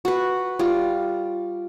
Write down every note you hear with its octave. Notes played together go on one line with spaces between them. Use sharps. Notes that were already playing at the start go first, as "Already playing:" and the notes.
F#4 B4
G3 F4